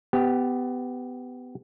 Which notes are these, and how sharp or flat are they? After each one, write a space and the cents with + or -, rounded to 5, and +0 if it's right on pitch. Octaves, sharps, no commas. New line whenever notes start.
B3 +20 G4 +0